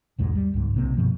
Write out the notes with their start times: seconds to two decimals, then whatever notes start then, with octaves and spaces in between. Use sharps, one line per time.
0.18 B1 E2 G#2 G#3
0.35 G3
0.54 C#2 G#2
0.74 B1 C3 A#3
0.97 G2 B2 F3